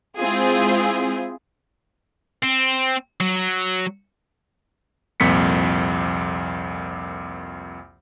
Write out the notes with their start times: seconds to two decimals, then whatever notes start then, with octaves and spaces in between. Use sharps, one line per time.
0.18 G#3 C4 E4 F4 G#4
2.43 C4
3.20 F#3
5.20 C2 F2 A#2 B6 C#7